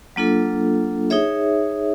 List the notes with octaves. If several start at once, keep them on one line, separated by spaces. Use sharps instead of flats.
F#3 A#3 D4 F4 A4
D#4 G#4 C#5 E5